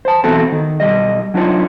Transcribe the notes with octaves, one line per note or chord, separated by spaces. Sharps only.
C5 A5
B1 E3 B3 C4 F#4 A4
D#3
B1 G3 D#5
F#3 D4 D#4 F4 C#5